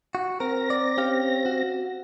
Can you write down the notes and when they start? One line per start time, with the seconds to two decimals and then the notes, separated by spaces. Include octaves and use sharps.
0.15 F#4
0.40 C4 A#4 A#6
0.70 D5
0.97 C#4 G4 F5
1.46 F#4